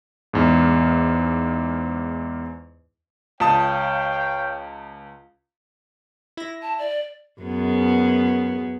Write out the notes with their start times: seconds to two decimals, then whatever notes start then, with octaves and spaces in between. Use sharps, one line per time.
0.33 E2 G#2
3.40 C#2 C#5 F5 G5 A5 D#6
6.37 E4 A#6
6.62 A5
6.79 D5
7.42 F#2 B3 G#4